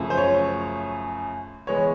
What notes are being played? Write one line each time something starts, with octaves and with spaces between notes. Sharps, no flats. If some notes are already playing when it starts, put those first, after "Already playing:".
Already playing: F#2 C#3 F3 A3
C5
C#5
E3 G#3 B3 C#5